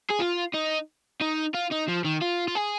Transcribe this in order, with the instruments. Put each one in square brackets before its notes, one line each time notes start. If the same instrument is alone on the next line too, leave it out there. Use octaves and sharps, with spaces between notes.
[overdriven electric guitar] G#4
F4
D#4
D#4
F4
D#4
F3
D#3
F4
F4
G#4